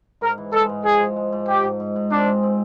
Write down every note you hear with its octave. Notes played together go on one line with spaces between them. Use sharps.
G#2 A#4
E3
G#3 A4
G#2
F3 G#4
G#3
G#3
G#2
G#2 G4
G#2
G#2
G#2
C4 D4
G#3
C4